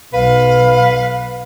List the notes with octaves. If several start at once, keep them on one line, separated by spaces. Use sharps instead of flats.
B1 B4 F5